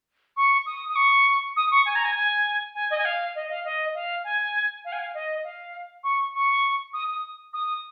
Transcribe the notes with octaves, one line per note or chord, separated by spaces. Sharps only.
C#6
D#6
D#6
C#6
D#6
C#6
G#5
A#5
G#5
G#5
G#5
D#5
G#5
F5
D#5
F5
D#5
F5
G#5
F5
G#5
F5
D#5
F5
C#6
C#6
D#6
D#6
D#6